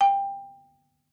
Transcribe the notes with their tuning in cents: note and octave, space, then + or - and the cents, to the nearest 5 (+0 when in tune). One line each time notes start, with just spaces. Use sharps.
G5 +15